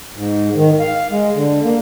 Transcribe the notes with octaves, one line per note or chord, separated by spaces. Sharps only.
G#2
D#3
F5
G#3
D3
A#3